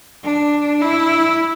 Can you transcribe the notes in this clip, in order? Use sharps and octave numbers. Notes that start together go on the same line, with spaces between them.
D4
E4